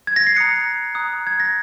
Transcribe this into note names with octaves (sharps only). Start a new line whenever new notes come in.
G#6
A#6
C7
A#5 D#6 F#6 C#7
A#5 D#6 F#6
G#6
A#6